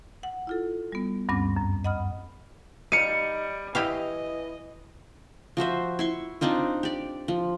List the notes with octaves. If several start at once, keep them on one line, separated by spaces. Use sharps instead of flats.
F#5
E4 F4 A4
G3 B3
D2 G2 G3 C4 C#4 D6
F#2
D#5 F#5 B5 D#6 F6
G3 D#4 F5 C#7 D#7
E3 E4 G4 D#5 F5
F3 F#4 C5 E5
E4 C6 C#6
C4 D4 D#4 F4
G4 D5
F3